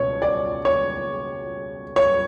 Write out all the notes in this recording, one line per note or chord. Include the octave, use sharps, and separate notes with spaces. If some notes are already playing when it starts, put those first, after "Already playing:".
Already playing: C#2 B2 C#5
D5
C#5
C#5